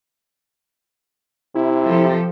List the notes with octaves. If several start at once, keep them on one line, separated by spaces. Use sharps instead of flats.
C3 E4
F3 G4 A4